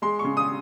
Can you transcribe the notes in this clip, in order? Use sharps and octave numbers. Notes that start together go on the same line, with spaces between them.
G#3 C6
C#6
C#3
D#6